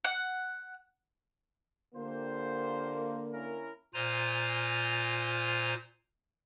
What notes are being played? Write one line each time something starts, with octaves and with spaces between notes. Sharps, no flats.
F#5
D3 A#3 F4 G4 C5
C#4 E4 A#4
A#2 F4 C5 G#5 A#5